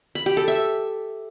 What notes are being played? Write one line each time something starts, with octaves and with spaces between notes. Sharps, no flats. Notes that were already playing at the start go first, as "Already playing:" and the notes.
B5
G4
A4
E5